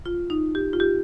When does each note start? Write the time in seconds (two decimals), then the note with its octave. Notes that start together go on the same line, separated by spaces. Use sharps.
0.06 F4
0.30 D#4
0.55 G4
0.73 F4
0.80 G4